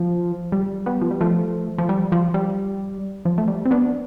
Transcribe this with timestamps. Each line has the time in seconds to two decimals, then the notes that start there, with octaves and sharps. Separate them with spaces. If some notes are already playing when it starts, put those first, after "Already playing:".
Already playing: F3
0.52 G3
0.86 G3 B3
1.02 F3
1.11 G3
1.21 F3 A3
1.78 F3
1.89 G3
2.12 F3
2.34 G3
3.25 F3
3.38 A3
3.48 G3
3.65 C4
3.71 B3 D4